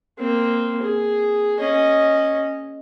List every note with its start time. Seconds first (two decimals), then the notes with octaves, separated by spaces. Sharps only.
0.18 A#3 C4
0.82 G#4
1.59 C#4 D#5